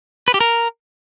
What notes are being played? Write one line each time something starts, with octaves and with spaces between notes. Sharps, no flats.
B4
G4
A#4